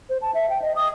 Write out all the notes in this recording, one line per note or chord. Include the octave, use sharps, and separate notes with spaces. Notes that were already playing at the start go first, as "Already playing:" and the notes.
C5
A5
E5
G5
D#5
D#6